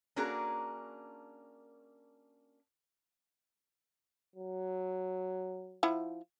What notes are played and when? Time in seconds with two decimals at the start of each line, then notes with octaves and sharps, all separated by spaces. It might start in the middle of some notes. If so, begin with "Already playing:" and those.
0.16 A#3 C#4 D4 F#4 G#4 A#4
4.36 F#3
5.83 F3 E4 F#5